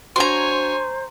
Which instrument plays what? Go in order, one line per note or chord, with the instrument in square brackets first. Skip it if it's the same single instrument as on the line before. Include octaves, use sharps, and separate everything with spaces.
[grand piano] D4 F#4 [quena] C5 [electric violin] C#5 G#5 [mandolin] A#5 C6